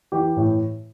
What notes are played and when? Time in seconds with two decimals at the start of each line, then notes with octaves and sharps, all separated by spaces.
0.12 E3 G4
0.37 A2